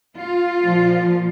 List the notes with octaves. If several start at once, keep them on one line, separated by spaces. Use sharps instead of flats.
F4
A#2 F3